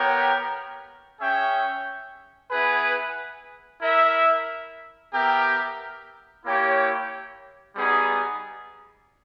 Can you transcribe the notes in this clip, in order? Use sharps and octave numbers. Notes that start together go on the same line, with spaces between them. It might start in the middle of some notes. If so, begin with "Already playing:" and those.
Already playing: B3 G4 A#4 C#5 G5
C#4 G#4 C#5 E5 G5
B3 E4 G#4 B4
E4 A#4 E5
B3 G4 A#4 E5 G5
A#3 E4 G4 C#5 G5
G3 B3 D#4 G#4